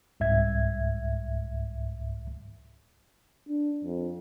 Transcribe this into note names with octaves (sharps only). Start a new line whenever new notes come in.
C2 G#2 E5 G#6
D4
F2